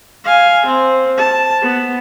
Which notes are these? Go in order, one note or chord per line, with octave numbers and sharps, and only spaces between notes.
F5 G#5
C4
A5
B3